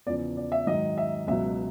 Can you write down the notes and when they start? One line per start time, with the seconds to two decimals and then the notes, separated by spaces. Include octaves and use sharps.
0.06 E2 C#3 F3 D5
0.37 D5
0.52 E5
0.67 G#2 D#3 F#3 D#5
0.98 E5
1.27 C#2 B2 F#3 E5